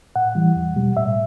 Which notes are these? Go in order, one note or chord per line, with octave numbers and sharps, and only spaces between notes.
A2 F#5
E3 G3
E2
B2 G3
A2 E5